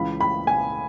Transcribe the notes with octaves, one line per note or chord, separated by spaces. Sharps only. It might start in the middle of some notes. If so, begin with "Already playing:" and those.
Already playing: C#2 C#3 E3 B5
B5
G#5